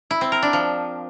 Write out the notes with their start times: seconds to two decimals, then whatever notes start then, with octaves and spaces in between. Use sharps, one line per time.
0.11 E4
0.21 C4
0.32 A#4
0.42 D4
0.53 F3